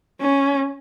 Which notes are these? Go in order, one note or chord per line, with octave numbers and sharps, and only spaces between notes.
C#4